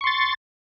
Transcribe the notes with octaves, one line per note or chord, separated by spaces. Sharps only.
C6 C#6 A6